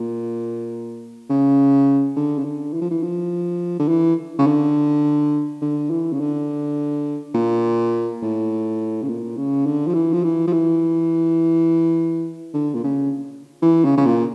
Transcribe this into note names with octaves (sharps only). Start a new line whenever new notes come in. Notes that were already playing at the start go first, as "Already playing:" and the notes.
Already playing: A#2
C#3
D3
C#3
D3
E3
F3
E3
F3
D3
E3
C#3
D3
D3
E3
C#3
D3
A#2
A2
C#3
A#2
C#3
D3
F3
E3
F3
E3
F3
E3
D3
A#2
C#3
E3
C#3
C#3
A#2